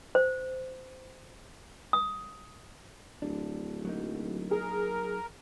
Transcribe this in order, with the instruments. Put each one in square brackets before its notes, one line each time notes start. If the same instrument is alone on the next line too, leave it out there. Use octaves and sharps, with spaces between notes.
[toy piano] C5
D#6
[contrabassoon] D1 [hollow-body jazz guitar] D4
[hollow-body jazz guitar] F#3 A#3 D#4
[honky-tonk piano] G#4 [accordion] A#4